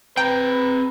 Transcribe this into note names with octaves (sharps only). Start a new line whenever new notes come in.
C4 B4 G5 A#5